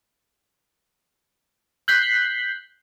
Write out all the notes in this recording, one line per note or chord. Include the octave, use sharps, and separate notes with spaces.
F#6 G6 B6 C7